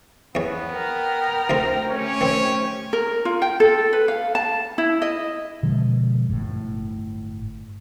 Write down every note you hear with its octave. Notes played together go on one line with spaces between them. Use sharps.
E2 B3 C#4
A#4 G5
D2 D3 C4
A3 C#4 G4 C#5
D#3 C4
A#4
F4
G5
A4
B4
F5
A5
E4
D#5
B2 D3 F3 G#3
G1 A2